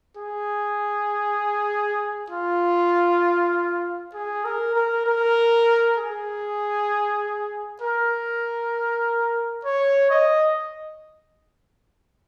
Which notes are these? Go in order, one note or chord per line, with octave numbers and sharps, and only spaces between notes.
G#4
F4
G#4
A#4
A#4
A#4
G#4
A#4
C#5
D#5